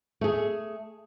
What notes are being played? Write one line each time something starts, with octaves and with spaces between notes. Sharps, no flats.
A3 G#4